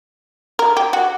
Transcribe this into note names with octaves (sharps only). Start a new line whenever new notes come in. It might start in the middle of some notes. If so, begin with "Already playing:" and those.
A#4
G4
F#4